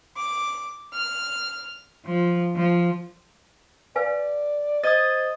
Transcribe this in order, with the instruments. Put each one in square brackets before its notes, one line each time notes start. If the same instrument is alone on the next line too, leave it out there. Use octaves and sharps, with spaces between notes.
[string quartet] D6
F6
F3
F3
[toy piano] B4 F5 G#5 [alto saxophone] D5
[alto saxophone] C5 [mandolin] D#5 [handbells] D#6 G#6 A6